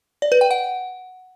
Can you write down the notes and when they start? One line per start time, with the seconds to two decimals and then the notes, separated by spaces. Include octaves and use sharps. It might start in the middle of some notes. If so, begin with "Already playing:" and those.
0.22 D5
0.32 B4
0.41 G5
0.51 F#5